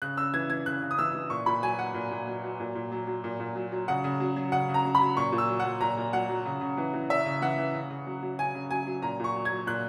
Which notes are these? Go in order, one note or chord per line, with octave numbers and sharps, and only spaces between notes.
C#3 F#6
C#3 E6
E3 G#6
E3 G#6
C#3 F#6
C#3
D#6
E3 E6
E3
A#2 C#6
A#2 B5
F#3 G#5
F#3 F#5
A#2
A#2
F#3
F#3
A#2
A#2
F#3
F#3
A#2
A#2
F#3
F#3
C#3 F#5
C#3
F#3
F#3
C#3 F#5
C#3
A#5
F#3
B5
F#3
A#2 C#6
A#2
E6
F#3
F#5
F#3
A#2 A#5
A#2
F#3 F#5
F#3
C#3
C#3
E3
E3
C#3 E5
C#3
E3 F#5
E3
C#3
C#3
F#3
F#3
C#3 G#5
C#3
F#3 G#5
F#3
A#2 A#5
A#2 C#6
F#3
G#6
F#3
A#2 F#6